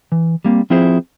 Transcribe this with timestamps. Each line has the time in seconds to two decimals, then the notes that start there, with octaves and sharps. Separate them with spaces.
0.12 E3
0.45 G3 A#3 C4
0.70 F3 C4 E4 F4 G#4 C5